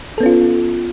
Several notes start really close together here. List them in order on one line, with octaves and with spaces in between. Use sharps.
A4 B3 C#4 F4